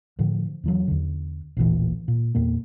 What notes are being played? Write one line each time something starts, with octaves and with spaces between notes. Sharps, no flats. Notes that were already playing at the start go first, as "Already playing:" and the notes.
A2 D3 F3
E2 E3 F#3
E2 D3
A1 D#2 A#2 E3
A#2
E2 A#2 A#3